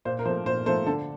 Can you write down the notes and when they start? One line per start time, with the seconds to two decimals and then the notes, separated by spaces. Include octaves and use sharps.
0.05 A#2 C5
0.19 A#4
0.25 F3 C5
0.29 A3
0.46 A#2 C5
0.66 F3 A3 C5
0.86 D3 A4